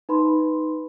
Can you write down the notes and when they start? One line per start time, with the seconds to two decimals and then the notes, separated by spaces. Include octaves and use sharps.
0.09 D#4 B4 B5 C6